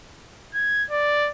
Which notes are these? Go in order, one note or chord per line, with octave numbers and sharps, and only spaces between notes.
G#6
D5